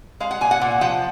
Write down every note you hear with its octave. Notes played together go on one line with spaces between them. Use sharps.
G#3 F5
F#5
A#2 G#5
F#5
A#2
F3 F#5